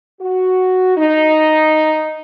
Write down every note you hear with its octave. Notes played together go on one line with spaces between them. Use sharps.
F#4
D#4